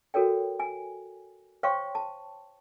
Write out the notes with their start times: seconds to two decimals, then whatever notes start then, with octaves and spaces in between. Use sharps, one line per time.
0.14 F#4 A4 A#4 C#5 G5
0.60 G#5
1.63 C5 C#5 F5 G5 C6 C#6
1.95 A5